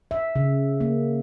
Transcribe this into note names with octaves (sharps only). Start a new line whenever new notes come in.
E5
C#3
A#3